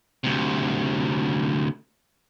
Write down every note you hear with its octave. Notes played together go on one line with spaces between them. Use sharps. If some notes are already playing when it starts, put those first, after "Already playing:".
D2 C3